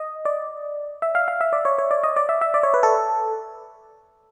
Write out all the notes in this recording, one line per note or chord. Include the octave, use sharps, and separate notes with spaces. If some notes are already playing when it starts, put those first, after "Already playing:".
Already playing: D#5
D5
E5
F5
F5
E5
D5
C#5
C#5
D5
D#5
D5
E5
E5
D5
C#5
B4
A4